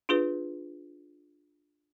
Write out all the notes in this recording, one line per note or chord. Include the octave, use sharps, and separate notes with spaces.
D4 F4 G#4 B4